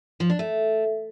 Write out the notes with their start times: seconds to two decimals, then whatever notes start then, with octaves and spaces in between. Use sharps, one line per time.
0.20 F3
0.30 D4
0.39 A3